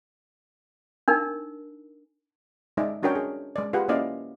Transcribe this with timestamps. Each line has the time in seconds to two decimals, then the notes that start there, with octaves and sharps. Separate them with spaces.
1.08 D4 D#4 A#4
2.77 G#3 D#4 D5 E5
3.03 C#4 D4 F#4 A#4 C#5 G5
3.15 G#4
3.56 G#3 D5
3.73 F4 G4 G#4 B4 F#5
3.88 A#3 C#4 E4 D5 D#5 F5